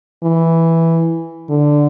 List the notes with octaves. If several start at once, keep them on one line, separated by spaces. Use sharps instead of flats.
E3
D3